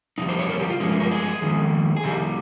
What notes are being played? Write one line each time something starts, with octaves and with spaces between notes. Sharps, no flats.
F2 C3 G3 D#4
C5
C#5
A#4
G4
F4
G2 F3 G#3 C#4
C#4
A#4
G#4
F2 D#3 G#3
G#4
F2 C3 G3 G4